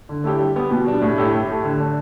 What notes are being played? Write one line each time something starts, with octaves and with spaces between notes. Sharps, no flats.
D3
A3 E4 G4
G3
B3 G4
B2
G3 D4
A2
A3 E4 G4
A2
A3 G4
D3
A3 D4